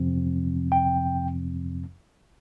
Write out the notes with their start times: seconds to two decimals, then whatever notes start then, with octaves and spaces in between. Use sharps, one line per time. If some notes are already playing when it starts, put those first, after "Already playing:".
Already playing: F2 C3 F3 C4
0.72 G5